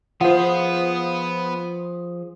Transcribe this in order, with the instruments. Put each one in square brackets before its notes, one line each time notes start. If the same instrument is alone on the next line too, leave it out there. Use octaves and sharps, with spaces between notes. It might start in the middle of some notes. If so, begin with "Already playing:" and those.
[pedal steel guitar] F3 G#4 [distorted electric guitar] B3 [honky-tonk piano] F4 C5 [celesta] F#5